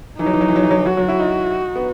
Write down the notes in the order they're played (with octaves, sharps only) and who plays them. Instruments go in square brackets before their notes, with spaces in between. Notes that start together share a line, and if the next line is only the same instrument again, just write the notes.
[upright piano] E3 [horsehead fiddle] D#4
[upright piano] F#3
E3
F#3
E3
F#3
E3
F#3
E3
[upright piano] F#3 [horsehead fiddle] F#4
[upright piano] F#3
E4
D#4
B3